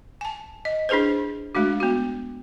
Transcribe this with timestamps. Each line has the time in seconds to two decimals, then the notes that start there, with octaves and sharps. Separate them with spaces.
0.21 G#5 A5
0.65 D#5
0.89 D4 E4 G#4 B4 C5
1.55 G#3 A3 D4 F#4
1.80 B3 F#4